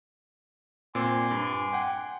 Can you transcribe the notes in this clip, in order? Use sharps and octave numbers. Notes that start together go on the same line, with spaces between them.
A#2 C4 G#5 C6 D6
G2
F#5 G5